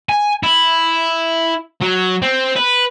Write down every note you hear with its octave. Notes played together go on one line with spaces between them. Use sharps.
G#5
E4
F#3
C4
B4